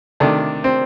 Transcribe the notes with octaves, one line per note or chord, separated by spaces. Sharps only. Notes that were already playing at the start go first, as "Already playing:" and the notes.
C3 D#3 A3 D4
C4